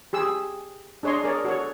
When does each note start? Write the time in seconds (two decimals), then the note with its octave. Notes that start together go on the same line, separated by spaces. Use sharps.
0.13 G4 G#4 E6
1.03 D4 G#4 C#5 D#5 C6
1.24 G#4 A#4 C#5 D5
1.45 F#4 A4 C#5